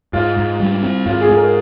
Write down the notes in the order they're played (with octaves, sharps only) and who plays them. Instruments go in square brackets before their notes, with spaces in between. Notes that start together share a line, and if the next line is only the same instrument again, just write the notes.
[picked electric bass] G#2 [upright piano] F4
[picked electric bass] G#2
G3
C4
[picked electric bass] G#2 [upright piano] F4
[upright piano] G#4
[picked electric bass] G#2
[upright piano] A#4